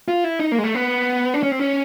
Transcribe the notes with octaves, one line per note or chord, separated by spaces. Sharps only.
F4
E4
D#4
A#3
G#3
A3
B3
D4
C#4
C4
C#4